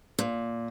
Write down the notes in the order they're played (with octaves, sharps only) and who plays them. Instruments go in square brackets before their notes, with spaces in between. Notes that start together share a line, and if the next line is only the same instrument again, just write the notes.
[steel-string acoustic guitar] A#2